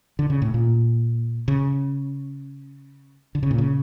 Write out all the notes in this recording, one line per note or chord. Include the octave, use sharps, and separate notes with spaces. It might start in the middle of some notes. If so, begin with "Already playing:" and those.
D3
C#3
A2
A#2
C#3
D3
C#3
A#2
C#3